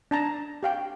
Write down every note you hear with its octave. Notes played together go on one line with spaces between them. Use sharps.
D4 A5 A#5
G4 F5 G5